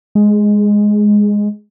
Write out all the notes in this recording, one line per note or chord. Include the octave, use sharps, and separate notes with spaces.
G#3